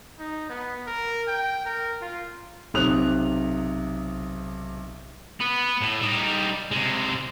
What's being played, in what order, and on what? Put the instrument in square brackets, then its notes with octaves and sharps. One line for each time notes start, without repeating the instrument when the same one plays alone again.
[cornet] D#4
B3
A#4
G5
A#4
F4
[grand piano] B1 C3 D#6 F#6 F7
[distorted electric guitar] B3
A2
G3 D#4
C3 G#3